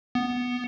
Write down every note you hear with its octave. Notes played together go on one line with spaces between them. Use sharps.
B3